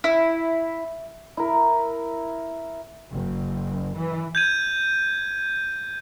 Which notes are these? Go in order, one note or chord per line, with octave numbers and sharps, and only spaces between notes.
E4
E4 A#4
F#1
E3
G6 G#6 D#7